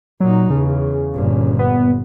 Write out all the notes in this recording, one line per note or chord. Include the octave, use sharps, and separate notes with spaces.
A#2 F#3 D#4
E2 C#3
G1 A#2
B3